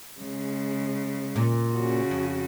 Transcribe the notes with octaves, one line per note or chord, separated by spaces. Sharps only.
C#3 G#3
A#2
C#3 F#4
F2